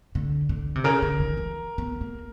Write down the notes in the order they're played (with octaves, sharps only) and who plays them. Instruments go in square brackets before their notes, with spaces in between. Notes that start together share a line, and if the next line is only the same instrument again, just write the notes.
[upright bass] D3
D3
C3
[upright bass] C#3 [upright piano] A#4 A#5
[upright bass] D3
D#3
E3
B3
A#3